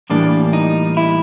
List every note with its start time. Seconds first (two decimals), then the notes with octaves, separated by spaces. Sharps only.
0.10 A2 E3 G3 A#3 D4
0.53 D#4
0.97 E4